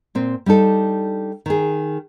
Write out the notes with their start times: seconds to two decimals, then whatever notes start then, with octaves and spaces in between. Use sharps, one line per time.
0.15 A#2 C4
0.46 G3 D4 D#4 A4
1.46 D#3 G#4